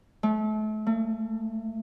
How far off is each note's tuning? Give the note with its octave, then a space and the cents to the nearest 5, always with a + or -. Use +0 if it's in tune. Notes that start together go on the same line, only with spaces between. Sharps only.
A3 -35
A3 +35